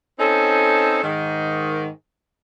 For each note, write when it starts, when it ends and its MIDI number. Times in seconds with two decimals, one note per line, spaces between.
0.19 1.01 60
0.19 1.01 61
0.19 1.01 63
0.19 1.01 69
1.03 1.86 44
1.03 1.86 51